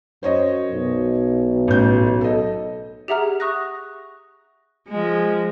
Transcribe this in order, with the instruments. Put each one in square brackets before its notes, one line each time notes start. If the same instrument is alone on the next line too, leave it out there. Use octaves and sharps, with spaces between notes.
[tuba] F#2 [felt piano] C5 C#5 D#5
[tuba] B1
[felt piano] A1 G6
A4 D#5
[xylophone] G4 G#4 E5 F#5 A#5 F6
C#6 D#6 F#6 A#6
[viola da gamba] F3 G#3